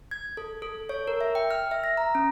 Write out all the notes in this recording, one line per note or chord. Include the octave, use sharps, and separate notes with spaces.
G#6
A4
A4
C#5
A#4
E5
G5
F6
E5
A#6
A#5
C#4